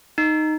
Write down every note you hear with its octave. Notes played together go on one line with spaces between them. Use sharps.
D#4